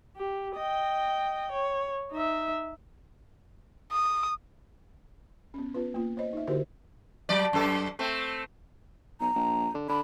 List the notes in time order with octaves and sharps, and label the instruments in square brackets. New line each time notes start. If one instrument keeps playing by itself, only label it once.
[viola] G4
D#5 G5
C#5
D#4 E5
[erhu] D#6
[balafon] B3 C#4
B3 F4 B4
A#3 F4
C5 C#5 D#5
D#4 E5
D3 E4 F#4 G4 A#4 C5
[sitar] F#3 D5
F#2 A4
A3 C4
[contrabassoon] B1 [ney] A#5
[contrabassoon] A#1
D3
[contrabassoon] D3 [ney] B5